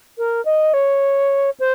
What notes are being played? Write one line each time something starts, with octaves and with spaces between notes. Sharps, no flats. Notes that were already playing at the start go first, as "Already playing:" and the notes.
A#4
D#5
C#5
C5